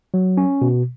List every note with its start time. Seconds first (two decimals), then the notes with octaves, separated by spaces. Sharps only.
0.14 F#3
0.37 C#4
0.62 B2